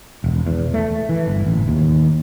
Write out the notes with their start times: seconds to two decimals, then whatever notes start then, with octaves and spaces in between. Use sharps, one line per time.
0.24 E1
0.46 E2
0.74 A3
1.09 E3
1.28 G1
1.47 A1
1.68 D#2